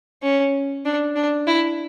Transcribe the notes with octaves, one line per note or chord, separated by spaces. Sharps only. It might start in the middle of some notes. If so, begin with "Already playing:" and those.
C#4
D4
D4
E4